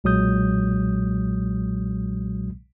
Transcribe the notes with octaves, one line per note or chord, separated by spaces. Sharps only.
B1 A#2 F#3 G#3 D#6 G6